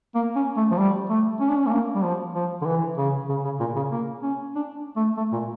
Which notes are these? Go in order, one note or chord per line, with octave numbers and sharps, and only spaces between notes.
A#3
C#4
A3
F3
G3
A3
C#4
D4
C#4
A3
A#3
G3
F3
F3
D3
E3
C#3
C#3
C#3
A#2
C#3
A#3
C#4
D4
A3
A3
A#2